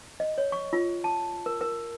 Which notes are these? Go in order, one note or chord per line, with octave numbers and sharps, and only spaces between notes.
D#5
C#5
C#6
F4
A5
A#4
A#4